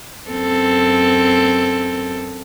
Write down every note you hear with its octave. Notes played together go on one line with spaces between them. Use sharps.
F#2 C4 A4